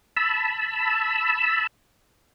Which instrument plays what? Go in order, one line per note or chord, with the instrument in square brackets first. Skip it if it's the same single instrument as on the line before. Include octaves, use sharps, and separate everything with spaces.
[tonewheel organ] A5 B5 E6